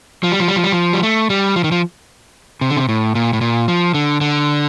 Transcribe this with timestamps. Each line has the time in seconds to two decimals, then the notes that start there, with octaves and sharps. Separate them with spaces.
0.23 F3
0.32 G3
0.40 F3
0.48 G3
0.56 F3
0.64 G3
0.72 F3
0.93 G3
1.03 A3
1.30 G3
1.56 F3
1.64 D#3
1.72 F3
2.61 C3
2.70 D3
2.77 C3
2.89 A2
3.15 A#2
3.33 A2
3.41 A#2
3.68 F3
3.94 D3
4.21 D3